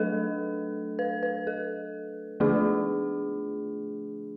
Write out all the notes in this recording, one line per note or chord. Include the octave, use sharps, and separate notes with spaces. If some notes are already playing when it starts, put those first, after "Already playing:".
Already playing: F#3 A3 D4 A4 B4
B4
B4
A4
D3 F3 A3 D4 F4 G#4